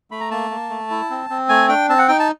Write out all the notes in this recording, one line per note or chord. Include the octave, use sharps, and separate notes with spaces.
A3 B5
A#5
A#3 A5
A#3
A3
E4
C4
C4
A3 G#5
D4 G5
C4 A5
F#5
D#4 G5
A5